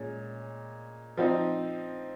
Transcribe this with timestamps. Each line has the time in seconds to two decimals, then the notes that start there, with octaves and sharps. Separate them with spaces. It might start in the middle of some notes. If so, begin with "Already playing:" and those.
Already playing: A#2 G#3 C#4
1.17 F3 C4 D#4